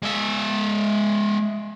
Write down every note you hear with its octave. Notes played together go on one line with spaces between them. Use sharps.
G#3 E5